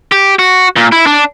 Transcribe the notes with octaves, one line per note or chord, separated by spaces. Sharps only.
G4
F#4
A#2
E4
D4